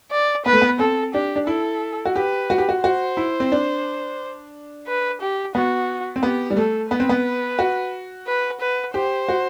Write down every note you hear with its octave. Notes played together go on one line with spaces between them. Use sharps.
D5
B3 B4
A3
B3
C4 A4
D4 G4
D4
E4 A4
F#4
G4 B4
F#4
G4
F#4
F#4 C5
E4
C4
D4
B4
G4
B3 F#4
C4
B3 G4
G3
A3 A4
B3 B4
C4
B3
F#4
B4
B4
G4 C5
F#4